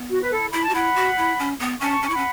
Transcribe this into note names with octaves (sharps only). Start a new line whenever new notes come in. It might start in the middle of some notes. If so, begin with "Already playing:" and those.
Already playing: B3
F#4
B4
E4 A4
E4 B5
A5
F#4
E4 F#5 B5
F#4
E4
C#4
B3
C#4 A5 C#6
C#4
C#6
E4
C#4 F#5 B5